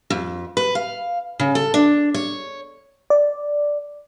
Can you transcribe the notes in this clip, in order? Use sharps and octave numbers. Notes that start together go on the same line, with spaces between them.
F2
B4
F5
C#3
A4
D4
C#5
D5